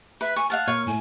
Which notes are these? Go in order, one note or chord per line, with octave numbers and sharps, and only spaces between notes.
B4 E5
G#5 C#6
F5 F#5 A5 F6
A#2 C#5
A2 A3 G#5